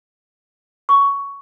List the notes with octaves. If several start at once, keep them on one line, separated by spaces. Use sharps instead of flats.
C#6